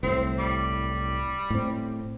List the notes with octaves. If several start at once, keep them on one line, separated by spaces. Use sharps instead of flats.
C2 A2 C4
G3
A2 C4